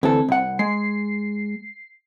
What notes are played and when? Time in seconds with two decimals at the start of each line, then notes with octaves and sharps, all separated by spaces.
0.03 D2 E3 C4 A4
0.29 C2 F#5
0.59 G#3 C7